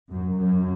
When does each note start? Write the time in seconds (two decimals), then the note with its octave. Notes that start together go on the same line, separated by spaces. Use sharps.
0.11 F#2
0.39 F#2